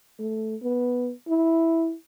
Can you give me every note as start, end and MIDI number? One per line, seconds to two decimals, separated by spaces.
0.19 0.56 57
0.62 1.12 59
1.28 1.94 64